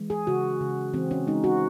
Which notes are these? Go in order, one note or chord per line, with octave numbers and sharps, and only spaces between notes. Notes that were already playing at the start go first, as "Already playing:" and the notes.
Already playing: E3 G#3
G#4
C#3 F#4
C#3
E3 C4
C#4
G#3 D#4
F#4